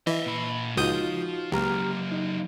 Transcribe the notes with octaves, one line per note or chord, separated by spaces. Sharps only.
E3 D#5 E5
A#2 B5
C#2 F3 D#4 F4 F#4 D#6 G6
C#2 F#3 A#3 G4 A#5 F6
D#4